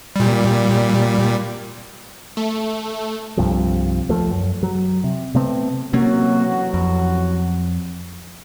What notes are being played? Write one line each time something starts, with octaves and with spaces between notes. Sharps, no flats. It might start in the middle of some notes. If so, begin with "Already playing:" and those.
A#2 G3
A3
C2 G2 C3 F3
D#2 F3 A3
F#2
F#3
C3
C3 A3 B3 C4
A1 C3 F#3 A#3 C#4 F#4
F2